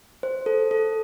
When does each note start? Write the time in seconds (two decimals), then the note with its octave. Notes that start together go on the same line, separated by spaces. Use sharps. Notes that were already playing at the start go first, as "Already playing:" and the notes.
0.23 C5
0.46 A4
0.71 A4